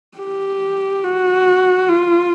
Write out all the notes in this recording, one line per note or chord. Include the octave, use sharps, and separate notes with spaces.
G4
F#4
F4